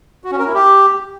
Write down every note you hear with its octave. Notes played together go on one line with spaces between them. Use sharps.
F#4
C#4
A#4
E4
G4